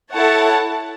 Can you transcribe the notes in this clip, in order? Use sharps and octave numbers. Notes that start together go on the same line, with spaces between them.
E4 A4 C#5 F#5 A5